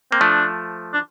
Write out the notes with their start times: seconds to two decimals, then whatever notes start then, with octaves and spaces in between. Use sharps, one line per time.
0.12 A#3 C4
0.21 F3 A3 D4
0.93 D4